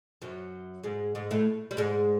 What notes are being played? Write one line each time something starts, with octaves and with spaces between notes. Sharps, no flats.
F#2 F#3
G#2 G#3
G#2 G#3
A2 A3
G3
G#2 G#3